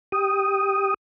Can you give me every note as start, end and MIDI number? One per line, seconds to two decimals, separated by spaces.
0.12 0.94 67
0.12 0.94 87